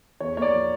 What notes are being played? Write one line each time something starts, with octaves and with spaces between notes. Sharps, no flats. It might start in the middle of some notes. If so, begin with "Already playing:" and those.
E2 C#5
A#3 C#5 D5
F3